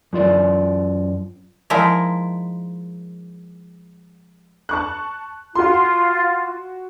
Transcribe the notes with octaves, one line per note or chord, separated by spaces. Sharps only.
F#2 F4 D5
F3 G#3 D#4 E4 A#4
A5 C#6 F#6
F4 F#4 C6